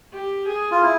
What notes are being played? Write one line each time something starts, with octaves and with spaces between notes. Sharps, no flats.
G4
G#4
F4
E4